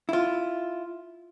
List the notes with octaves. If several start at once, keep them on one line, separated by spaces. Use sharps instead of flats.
E4 F4